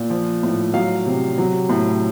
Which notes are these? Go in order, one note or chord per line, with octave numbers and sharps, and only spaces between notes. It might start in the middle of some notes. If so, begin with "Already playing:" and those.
Already playing: A#2
F3
A2
F#3 F5
C3
F#3
A2